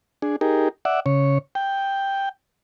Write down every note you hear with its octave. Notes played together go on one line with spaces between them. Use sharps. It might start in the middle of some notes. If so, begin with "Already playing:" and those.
D4 G#4
D#4 G4 G#4 A#4
D5 E5 F#5
C#3 C#5
G5